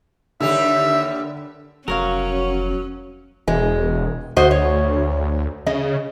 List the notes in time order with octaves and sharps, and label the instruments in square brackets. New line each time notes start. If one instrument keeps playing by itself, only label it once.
[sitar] D#2 G3 G4 [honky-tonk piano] D3 [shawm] E5
[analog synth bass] F1 [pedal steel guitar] F#3 [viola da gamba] C#4 [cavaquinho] A#4 C#5 F5
[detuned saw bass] E1 [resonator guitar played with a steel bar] G#3
[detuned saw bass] D2 [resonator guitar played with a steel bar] F#4 C5 D#5
[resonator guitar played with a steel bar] C#5
[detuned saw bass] C#3 [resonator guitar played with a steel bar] D#5